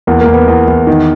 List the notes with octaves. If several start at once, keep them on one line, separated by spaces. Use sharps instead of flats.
E2 A#3
A#3
E2
B3
E2
E2
D#3